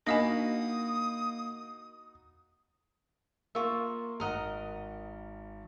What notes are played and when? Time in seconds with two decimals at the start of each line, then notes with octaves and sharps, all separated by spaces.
0.07 A#3 D4 D#4 F#4 D#5 G#5 B5 D#6
3.55 A#3 F4 E5 C#6
4.20 G#1 A#4 D#5 F#5